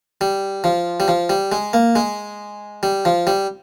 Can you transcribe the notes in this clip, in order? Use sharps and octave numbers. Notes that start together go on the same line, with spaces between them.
G3
F3
G3
F3
G3
G#3
A#3
G#3
G3
F3
G3